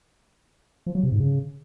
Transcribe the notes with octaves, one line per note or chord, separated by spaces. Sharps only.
F3
F#3
C3
G#2
C#3